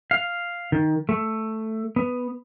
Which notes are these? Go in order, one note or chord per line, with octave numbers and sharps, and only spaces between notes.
F5
D#3
A3
B3